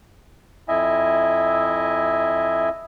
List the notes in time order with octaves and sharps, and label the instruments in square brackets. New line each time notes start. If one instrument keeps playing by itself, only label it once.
[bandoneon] F2 E4 D#5 E5 G#5